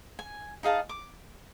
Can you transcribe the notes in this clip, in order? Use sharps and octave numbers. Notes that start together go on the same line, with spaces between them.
G#5
D#4 G#4 F5 A5
D6